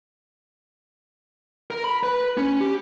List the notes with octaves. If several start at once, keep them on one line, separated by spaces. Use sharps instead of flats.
A#4
B5
B4
C#4
G4